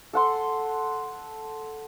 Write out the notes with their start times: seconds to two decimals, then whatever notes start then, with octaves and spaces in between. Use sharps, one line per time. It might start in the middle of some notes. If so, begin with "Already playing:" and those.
0.13 A4 F#5 C6